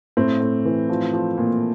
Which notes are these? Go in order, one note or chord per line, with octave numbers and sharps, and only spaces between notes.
A2 C4
A2
E3
F3
F3
A#2